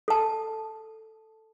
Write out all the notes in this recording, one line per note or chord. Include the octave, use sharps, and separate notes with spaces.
A4 A5